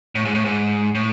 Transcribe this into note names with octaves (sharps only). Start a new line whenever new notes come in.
A2
G#2
A2
G#2
A2